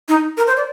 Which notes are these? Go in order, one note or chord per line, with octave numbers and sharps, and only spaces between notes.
D#4
A#4
C5
D5